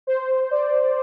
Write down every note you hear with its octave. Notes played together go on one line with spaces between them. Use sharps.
C5
D5